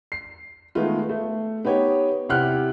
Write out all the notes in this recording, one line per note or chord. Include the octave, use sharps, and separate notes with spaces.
C7
D#3 G#3 A3 B3 F4
A3
B3 D#4 G4 C#5
C3 E4 G4 F#5 F6 F#6